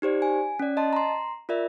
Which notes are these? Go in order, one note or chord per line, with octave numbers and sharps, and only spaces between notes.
D#4 G4 C5 D5
G#5
C#4 D5
D#5 A5 C6
A#5 C6
F4 A#4 D5 E5